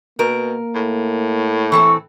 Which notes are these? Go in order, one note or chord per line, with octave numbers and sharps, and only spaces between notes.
B2 A#3 A#4
A2
E3 C4 A4 C#6